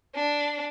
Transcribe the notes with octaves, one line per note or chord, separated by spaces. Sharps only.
D4